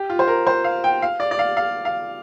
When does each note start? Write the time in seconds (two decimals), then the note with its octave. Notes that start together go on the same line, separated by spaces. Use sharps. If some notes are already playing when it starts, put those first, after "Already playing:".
Already playing: G4
0.10 F4
0.19 C5
0.28 A#4
0.47 C5
0.64 F5
0.84 G5
1.02 F5
1.20 D5
1.31 D5
1.39 F5
1.57 F5
1.85 F5